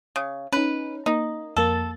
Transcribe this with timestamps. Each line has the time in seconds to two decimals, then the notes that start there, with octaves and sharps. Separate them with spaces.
0.16 C#3
0.53 C#4 D#4 B4
1.06 A#3 D#4
1.57 F2 A#3 A4 A6